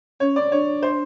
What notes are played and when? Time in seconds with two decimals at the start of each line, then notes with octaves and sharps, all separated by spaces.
0.20 C#4 C#5
0.36 D5
0.52 D4 C#5
0.83 C5